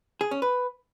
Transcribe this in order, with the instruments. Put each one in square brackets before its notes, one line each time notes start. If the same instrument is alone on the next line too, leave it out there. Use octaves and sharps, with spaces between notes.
[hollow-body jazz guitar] G#4
C#4
B4